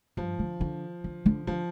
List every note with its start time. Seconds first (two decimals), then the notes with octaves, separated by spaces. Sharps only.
0.17 G2 F3
0.39 D3
0.61 D3
1.04 D3
1.26 D3
1.47 D3 F3